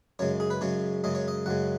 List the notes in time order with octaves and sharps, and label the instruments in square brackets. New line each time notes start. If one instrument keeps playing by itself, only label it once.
[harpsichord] F#2 C#3 G#3 C#5
G#4
B4
F#2 C#3 G#3 C#5
F#2 C#3 G#3 D#5
C#5
D#5
F#2 C#3 G#3 F#5